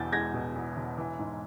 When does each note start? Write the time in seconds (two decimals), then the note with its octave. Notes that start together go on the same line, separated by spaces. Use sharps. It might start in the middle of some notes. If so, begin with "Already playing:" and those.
Already playing: E1 E2 G6 A6
0.12 G#3 G#6 A#6
0.34 B2
0.55 E2
0.77 E1
0.98 E3
1.19 G#2